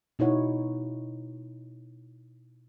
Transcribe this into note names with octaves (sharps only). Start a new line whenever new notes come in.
B2 D#4 E4 C#5 F#5